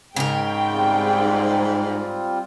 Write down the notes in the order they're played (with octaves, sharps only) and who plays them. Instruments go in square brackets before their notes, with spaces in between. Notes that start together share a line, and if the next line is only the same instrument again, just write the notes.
[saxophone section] G#2 [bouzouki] C#3 A#4 [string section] G5
[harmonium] G3 C4 F4